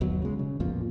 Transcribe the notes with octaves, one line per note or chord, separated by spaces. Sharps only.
G1 D#2 B2 F#3
C#3 G#3
C#3
A1 E2 A#2 F3